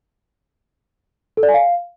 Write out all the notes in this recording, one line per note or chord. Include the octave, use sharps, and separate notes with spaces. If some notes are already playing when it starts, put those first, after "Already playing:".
A4
D5
G#5
F5